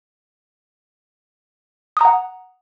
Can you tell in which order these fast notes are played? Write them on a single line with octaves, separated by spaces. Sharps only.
D#6 A#5 F#5